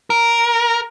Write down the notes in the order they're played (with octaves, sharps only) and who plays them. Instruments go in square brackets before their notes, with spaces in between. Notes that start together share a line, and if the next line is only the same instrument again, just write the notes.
[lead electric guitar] A#4